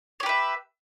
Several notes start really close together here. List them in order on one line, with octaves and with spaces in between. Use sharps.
C#5 G4 B4 E5